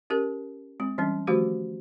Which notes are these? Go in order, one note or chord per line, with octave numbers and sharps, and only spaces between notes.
C#4 G4 A#4
G#3 C4
E3 G3 C#4 D4
D#3 F3 A3 F#4 G4 C5